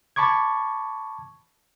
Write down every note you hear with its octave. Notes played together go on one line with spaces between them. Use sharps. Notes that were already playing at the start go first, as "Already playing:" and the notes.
A5 B5 C#6 D6 G#6